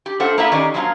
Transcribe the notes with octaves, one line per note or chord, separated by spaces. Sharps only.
G4
A3 C4 F4 C5 F#5
A#3 B3 D4 E4 F4 E5
D#3 C#4 D#4 G4 G#4 D5
F3 F#3 G#3 A#3 E4 F4